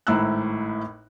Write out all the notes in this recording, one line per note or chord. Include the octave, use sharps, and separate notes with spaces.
G#1 A2 E4 A#5 E6 F#6